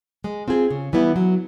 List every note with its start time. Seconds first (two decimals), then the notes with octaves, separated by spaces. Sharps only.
0.24 G#3
0.48 C4 F4 G#4
0.70 C#3
0.93 E3 G3 B3 E4
1.16 F#3